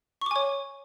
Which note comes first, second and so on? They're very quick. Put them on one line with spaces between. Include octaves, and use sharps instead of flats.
C#6 D6 G#5 C#5